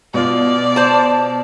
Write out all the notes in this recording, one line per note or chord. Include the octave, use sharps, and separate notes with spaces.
B2 F4 D5
C5 A5